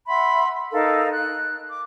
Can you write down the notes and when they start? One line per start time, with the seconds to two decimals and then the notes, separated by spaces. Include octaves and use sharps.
0.07 E5 F#5 B5 C6
0.72 D#4 A4 A#4 F5
1.12 F#6
1.70 D6